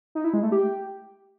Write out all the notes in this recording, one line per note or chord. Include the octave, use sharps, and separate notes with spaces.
D#4
E4
G#3
A3
G4